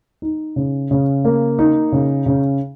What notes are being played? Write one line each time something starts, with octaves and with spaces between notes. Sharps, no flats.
D#4
C#3
C#3
A#3
D#4
C#3
C#3